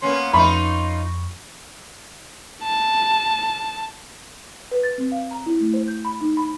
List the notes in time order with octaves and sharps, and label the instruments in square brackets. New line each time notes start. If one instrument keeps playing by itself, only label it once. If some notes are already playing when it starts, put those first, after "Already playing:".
[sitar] A#3 B3 C#4 [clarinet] C6
[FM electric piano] F2 C#6 [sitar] D#4 F4 [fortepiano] B5
[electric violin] A5
[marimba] B4
A6
C4
F5
A#5
E4
A3
C5
G6
B5
D#4
B5